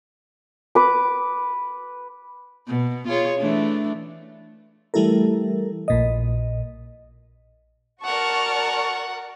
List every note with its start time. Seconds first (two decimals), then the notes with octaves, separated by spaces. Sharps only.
0.75 B4 D6
2.68 B2
3.08 F4 G#4 C#5
3.39 E3 A3 D4
4.94 E3 G3 A3 E4 A4 A#4
5.88 A#1 A#2 D#5
8.05 F#4 A#4 D5 F#5 A5 C#6 F6